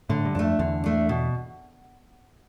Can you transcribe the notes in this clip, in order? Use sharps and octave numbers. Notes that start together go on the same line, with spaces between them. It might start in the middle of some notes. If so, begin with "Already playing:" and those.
A2 D3
G2
F2 A3 D4
E2 D3
A3 D4
B2